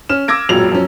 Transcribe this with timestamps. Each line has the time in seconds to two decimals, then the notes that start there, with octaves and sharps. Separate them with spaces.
0.09 C#4 F6 E7
0.28 D6 E6 G#6 A#6 D7
0.49 E1 A1 F#2 A#2 F#3 F7
0.72 F#2 F3 C#4